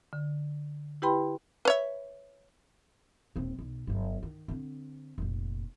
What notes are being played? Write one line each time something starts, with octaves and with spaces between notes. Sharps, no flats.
D3
E4 G4 B4 G5 B5 C6
B4 C#5 E5
D#1 C4
B1
G1 F#3
D#3
D3 C4
F1 A#2